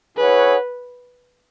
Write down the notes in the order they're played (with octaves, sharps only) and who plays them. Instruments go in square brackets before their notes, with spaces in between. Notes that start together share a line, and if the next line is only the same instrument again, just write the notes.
[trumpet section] E4 G#4 C#5 F#5 [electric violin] B4